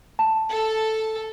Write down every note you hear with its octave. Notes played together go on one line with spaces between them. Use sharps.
A5
A4